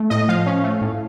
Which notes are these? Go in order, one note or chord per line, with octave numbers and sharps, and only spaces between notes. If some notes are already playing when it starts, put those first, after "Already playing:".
Already playing: A3
A2 D#5
F3 F5
C#4
A3
A2